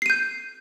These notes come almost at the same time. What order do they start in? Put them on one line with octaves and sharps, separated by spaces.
C7 D#7 G6